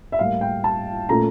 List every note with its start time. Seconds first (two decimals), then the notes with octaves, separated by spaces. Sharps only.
0.12 E5
0.19 A2 G3 A#3 F5
0.41 G5
0.64 A5
1.09 A#2 A3 C#4 A#5